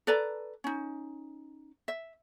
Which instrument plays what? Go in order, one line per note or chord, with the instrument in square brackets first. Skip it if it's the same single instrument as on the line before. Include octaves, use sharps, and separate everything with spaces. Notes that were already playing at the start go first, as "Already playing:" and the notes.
[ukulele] A4 B4 D5 A#5
C#4 D#4
E5